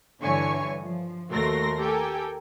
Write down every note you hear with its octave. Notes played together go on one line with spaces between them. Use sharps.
G2 D3 E3 C#5 G#5 C#6
F3
D#2 A3 F#4 A#4 C6 A#6
G4 A4 A#4 G5 G#5